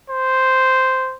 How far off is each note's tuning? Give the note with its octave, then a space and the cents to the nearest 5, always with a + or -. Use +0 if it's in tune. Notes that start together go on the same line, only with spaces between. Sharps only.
C5 -5